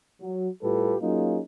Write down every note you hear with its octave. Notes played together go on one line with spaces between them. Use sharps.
F#3
A2 G3 F4 G4 A4 B4
F#3 A#3 C#4 D#4 F4 G#4